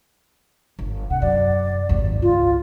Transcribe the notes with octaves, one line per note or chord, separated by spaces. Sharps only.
G1
C3 F#5
F#2 D5
G#1 D#2
C#2 F4